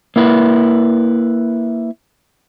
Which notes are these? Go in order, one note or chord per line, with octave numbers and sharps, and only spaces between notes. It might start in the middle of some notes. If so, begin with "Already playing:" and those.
A#3 E4 B4